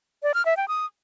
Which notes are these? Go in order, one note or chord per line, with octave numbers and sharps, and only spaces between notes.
D5
F6
E5
G5
D#6